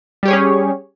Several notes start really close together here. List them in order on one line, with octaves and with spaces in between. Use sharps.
G3 G4 C#5 G#4 C#4